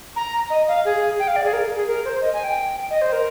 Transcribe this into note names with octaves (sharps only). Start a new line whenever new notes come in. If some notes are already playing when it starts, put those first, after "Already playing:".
A#5
D#5
F5
G#4
G5
F5
D5
G#4
A#4
G#4
A#4
C5
D#5
G#5
G5
D#5
C5
A#4